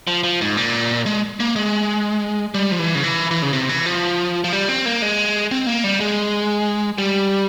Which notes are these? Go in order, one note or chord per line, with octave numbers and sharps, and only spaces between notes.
F3
F3
G#2
A#2
G#3
A#3
G#3
G3
F3
E3
C#3
E3
E3
C#3
C3
E3
F3
F3
G3
C4
A#3
G#3
C4
A#3
G3
G#3
G3